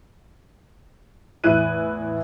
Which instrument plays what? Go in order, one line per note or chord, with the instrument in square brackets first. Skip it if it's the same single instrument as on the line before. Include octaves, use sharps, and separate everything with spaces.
[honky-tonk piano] E2 A2 E4 F#6 D#7